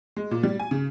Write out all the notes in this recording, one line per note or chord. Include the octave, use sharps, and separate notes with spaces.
G#3
A#2
G3
G#5
C#3